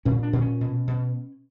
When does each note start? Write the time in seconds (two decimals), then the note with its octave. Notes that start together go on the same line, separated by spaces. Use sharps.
0.05 A#2 C#4
0.23 D4
0.33 A#2
0.41 C#4
0.61 B2
0.88 B2